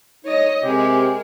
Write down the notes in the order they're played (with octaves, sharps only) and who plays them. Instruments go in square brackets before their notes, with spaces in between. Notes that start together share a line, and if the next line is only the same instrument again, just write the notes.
[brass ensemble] D#4 [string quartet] C#5 D#5
[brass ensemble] C3 [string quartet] G#3 A#4 [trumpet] G4